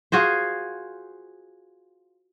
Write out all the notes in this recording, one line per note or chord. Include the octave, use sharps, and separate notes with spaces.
F4 F#4 G#4 C5